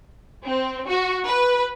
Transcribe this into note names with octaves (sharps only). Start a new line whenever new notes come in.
C4
F#4
B4